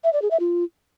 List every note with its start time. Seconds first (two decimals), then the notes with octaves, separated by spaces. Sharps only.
0.04 E5
0.13 D5
0.22 G#4
0.31 E5
0.40 F4